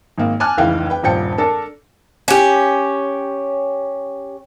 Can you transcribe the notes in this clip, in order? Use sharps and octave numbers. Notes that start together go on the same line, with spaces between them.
G#1 A#3
G#5 A5 D6 F6 F#6
F1 C#2 E3 F5 G5
B4 G5
D#1 G2 F3 C5 G5 C#7
D4 A4 A#4
C#4 G4